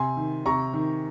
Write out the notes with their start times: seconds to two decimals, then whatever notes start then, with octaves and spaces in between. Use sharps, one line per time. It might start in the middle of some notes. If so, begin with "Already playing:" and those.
Already playing: C3 G#5 C6
0.17 D#3
0.46 C3 A#5 C#6
0.74 D#3